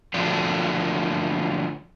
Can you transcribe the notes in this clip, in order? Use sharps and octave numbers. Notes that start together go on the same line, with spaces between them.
D3 F3 F#3 A3 D4